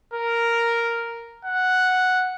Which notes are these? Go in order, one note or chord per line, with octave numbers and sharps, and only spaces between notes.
A#4
F#5